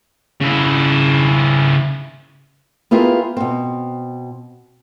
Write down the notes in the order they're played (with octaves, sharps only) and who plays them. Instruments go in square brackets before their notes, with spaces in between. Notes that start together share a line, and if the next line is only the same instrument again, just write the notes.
[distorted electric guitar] C#3 E4
[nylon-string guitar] B3 E4 F4 G4 G#4 A#4
B2 C4